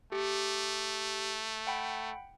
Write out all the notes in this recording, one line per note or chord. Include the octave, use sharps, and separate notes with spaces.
A3 G4
F#5 G5 B5